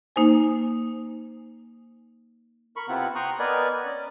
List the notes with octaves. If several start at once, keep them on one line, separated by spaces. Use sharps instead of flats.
A#3 D#4 C5 G#5
A#4 B5 C#6
C3 B3 C4 E4 F4 F#5
G5 A#5 C6 C#6 D#6 F#6
B3 A#4 B4 D5 D#5 G#5
C#4 D5